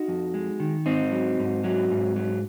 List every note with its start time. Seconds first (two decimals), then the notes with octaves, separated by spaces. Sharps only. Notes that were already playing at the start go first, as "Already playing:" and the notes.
Already playing: D#4 F#4
0.08 F2
0.34 G#3
0.60 D#3
0.86 G#2 C4 D#4
1.12 F#3
1.39 G#2
1.64 F#3
1.91 G#2
2.16 F#3